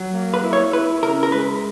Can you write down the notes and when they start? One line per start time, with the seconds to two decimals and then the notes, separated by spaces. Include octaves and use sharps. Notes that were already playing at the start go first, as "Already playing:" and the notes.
Already playing: F#3
0.13 A#3
0.34 B4
0.44 E4
0.53 C#5
0.73 E4 B4
1.03 C#3 A#4
1.23 A#4
1.32 G#3 B4